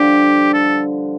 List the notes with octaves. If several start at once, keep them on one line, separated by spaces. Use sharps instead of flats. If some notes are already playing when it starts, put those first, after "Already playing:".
Already playing: G2 D3 F3 G4
A4